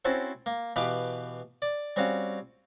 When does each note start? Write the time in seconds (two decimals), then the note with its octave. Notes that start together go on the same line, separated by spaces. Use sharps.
0.05 C4 C#4 E4 F#4 A4 C5
0.46 A#3
0.76 B2 E3 G4 B4 F5 D6
1.62 D5
1.96 G3 C4 C#4 F#4 F5